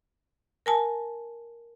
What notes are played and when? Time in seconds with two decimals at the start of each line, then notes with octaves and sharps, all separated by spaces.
0.66 A#4 G#5 A5